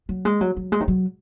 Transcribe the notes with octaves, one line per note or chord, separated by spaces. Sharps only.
F#3
G#3
F#3
F#3
G#3
D#3
F#3